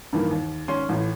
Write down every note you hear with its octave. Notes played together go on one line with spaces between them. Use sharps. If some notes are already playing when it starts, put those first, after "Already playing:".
G2 D#3 E3 A#3
D#2
G#1 C#4 C6
A1 A2